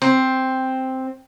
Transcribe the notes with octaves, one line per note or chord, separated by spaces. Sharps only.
C4